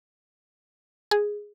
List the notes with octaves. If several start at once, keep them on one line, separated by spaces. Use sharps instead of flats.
G#4